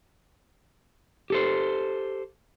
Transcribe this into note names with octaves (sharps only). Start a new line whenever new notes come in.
G4 A4 C5